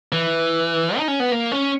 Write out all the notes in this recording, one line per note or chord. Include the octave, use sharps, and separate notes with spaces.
E3
D#4
C#4
B3
A#3
C#4